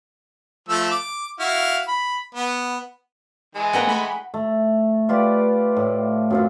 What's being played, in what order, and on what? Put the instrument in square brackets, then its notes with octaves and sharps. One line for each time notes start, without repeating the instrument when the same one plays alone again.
[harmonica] F3 A3 E6
D6
E4 F#4 F5
B5
B3
[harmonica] E3 G#3 [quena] G#5
[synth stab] A#3 C4 B4 [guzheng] F#5 G5 A#5
[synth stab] A3 B5 C#6
[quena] G#5
[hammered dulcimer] A3
F4 G4 B4 D5
A2
F#2 C4 F4